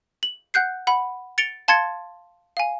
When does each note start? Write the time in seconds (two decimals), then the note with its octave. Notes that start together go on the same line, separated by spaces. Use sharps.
0.23 F#7
0.54 F#5 F#6 G6 C7
0.87 F#5 B5
1.38 A6 C#7 D7 F7 G7
1.68 F5 A5 C6 G#6 A6 C#7
2.57 F5 G#5